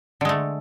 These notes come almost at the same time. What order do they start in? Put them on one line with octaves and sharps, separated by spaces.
D3 G#3 A3